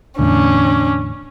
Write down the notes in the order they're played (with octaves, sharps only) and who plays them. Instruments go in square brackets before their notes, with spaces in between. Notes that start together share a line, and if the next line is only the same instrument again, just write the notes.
[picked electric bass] E2 A2 D3 [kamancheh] C#4 D4